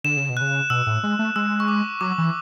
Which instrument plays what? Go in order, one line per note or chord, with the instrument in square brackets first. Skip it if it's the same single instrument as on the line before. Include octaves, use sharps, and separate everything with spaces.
[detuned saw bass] D3 [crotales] E7
[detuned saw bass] C#3
B2
[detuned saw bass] C#3 [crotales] F#6
[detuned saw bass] B2 [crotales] E6
[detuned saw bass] A2
G#3
A3
[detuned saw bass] G#3 [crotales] E6
[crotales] C#6
D6
[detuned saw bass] F#3 [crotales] D6
[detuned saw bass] E3